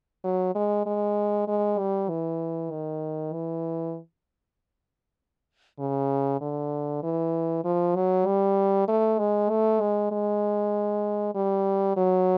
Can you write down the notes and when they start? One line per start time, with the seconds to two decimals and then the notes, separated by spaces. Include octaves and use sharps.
0.24 F#3
0.55 G#3
0.86 G#3
1.48 G#3
1.79 G3
2.09 E3
2.71 D#3
3.33 E3
5.79 C#3
6.41 D3
7.03 E3
7.64 F3
7.95 F#3
8.26 G3
8.88 A3
9.19 G#3
9.50 A3
9.80 G#3
10.11 G#3
11.35 G3
11.96 F#3